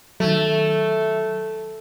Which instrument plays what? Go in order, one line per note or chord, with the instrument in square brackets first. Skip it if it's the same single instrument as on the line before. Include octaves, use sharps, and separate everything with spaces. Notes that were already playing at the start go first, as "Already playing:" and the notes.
[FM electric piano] D#3 F#3 [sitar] A3